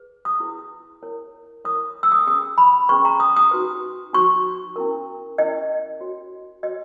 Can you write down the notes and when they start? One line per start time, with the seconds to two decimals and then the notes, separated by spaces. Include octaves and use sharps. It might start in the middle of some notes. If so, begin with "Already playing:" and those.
Already playing: G#4 B4
0.25 D#6
0.40 E4 G#4 B4
1.03 E4 A#4 C#5
1.65 E4 A#4 C#5 D#6
2.03 E6
2.12 D#6
2.19 E6
2.27 C#4 G#4 B4 D#6
2.58 B5
2.89 C#4 G#4 B4 C#6
3.05 A#5
3.20 D#6
3.36 D#6
3.51 D#4 F#4 B4
4.13 D#4 F#4 B4 C#6
4.76 C#4 E4 A#4
5.38 C#4 E4 A#4 D#5
6.01 F#4 C#5
6.63 F#4 C#5 D#5